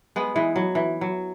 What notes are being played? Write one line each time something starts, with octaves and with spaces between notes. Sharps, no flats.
G#3 B3
E3 G#3
F#3
E3
F#3